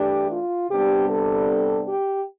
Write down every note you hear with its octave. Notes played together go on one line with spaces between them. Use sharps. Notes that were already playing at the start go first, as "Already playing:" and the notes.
Already playing: E3 A3 D4 G4
F4
C3 G3 B3 D4 G4
A4
G4